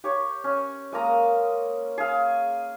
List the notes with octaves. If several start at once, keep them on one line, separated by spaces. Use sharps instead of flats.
G4 C#5
C#4
G#3 A#3 A#5 D#6
G#4 F5